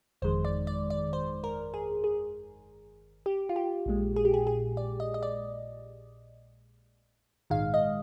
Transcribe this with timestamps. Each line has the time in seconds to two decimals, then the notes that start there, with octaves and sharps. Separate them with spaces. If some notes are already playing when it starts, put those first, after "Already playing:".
0.22 G1 F2 D#3 G#3 C5
0.45 D5
0.67 D5
0.90 D5
1.13 C5
1.44 A#4
1.74 G#4
2.04 G#4
3.26 G4
3.49 F4
3.56 G4
3.86 A#1 A#2 G#3
4.16 G#4
4.25 G4
4.34 G#4
4.47 G#4
4.77 D5
5.00 D#5
5.14 D#5
5.23 D5
7.50 A#1 G#2 D#3 G#3 F5
7.74 D#5